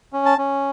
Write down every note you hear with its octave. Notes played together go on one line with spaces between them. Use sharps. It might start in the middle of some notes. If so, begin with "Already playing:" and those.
C#4
A5
C#4